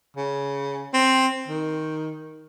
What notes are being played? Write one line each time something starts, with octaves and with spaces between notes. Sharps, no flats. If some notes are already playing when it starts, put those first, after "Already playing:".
C#3
C4
D#3